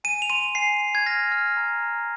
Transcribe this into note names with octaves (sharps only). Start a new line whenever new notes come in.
G#5 D#7
F7
C6 D#7
G#5 C7
G#5
G#6
F6 A#6
F6
A#5
A#5